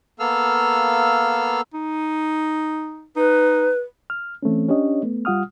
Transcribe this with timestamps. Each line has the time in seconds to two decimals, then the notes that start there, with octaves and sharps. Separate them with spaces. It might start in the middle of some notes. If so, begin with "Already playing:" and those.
0.20 A#3 B3 A4 F5 E6 F6
1.74 D#4
3.17 D#4 B4
4.10 F6
4.43 E3 A3 C4 C#4
4.68 C#4 D4 G4 C#5 D#5
5.03 A3 B3
5.25 G3 F4 F#5 D#6 F6